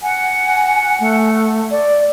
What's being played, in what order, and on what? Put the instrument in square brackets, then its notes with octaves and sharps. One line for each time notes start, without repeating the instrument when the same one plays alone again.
[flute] F#5 [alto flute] G#5
[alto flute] A3
D5